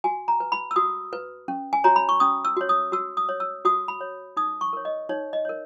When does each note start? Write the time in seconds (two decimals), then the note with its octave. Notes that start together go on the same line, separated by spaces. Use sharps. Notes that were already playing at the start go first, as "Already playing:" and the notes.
0.04 F#4 G#5
0.28 A#5
0.40 B4
0.52 B5
0.71 E6
0.76 F#4 D#6
1.13 B4
1.48 C#4
1.73 G#5
1.84 F#4 C#5 A#5
1.96 B5
2.09 C#6
2.20 C#4 D#6
2.45 E6
2.57 F#4 C#5
2.69 D#6
2.92 F#4 E6
3.17 D#6
3.29 C#5
3.40 E6
3.65 F#4 D#6
3.88 B5
4.01 C#5
4.37 D#4 D#6
4.61 C#6
4.73 A#4 C#5
4.85 D#5
5.09 D#4 C#5
5.33 D#5
5.45 A#4 C#5